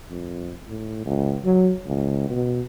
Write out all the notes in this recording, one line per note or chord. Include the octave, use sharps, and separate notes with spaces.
F2
A2
C#2
F#3
C#2
B2